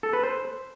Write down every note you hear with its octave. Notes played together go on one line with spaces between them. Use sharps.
A4
B4
C5